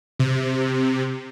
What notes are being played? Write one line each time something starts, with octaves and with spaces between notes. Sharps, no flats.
C3